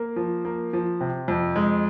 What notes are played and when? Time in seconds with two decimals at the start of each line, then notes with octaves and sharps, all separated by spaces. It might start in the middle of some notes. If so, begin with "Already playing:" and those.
Already playing: A#3
0.16 F3
0.45 A#3
0.73 F3
1.00 C3
1.28 F2
1.56 G#3